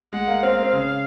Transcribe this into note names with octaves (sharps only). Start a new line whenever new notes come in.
G#3 F#5
A#3
C4 F5
A#3
C4
C#3